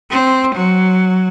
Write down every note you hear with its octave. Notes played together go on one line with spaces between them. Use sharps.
C4
F#3